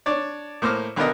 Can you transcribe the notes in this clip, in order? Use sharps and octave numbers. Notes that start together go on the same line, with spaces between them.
D4 C#5 D5
A2 A#3 C5 D6 F6
B1 D3 B3 A#4 D#5